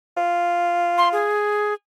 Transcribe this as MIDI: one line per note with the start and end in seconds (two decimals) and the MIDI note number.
0.17 1.30 65
0.98 1.08 84
1.12 1.73 68